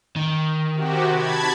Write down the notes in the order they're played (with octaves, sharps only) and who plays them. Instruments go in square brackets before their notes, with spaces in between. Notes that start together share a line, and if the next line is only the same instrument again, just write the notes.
[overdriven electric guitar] D#3
[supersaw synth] C3 F#4 G4
A5 B5 G#6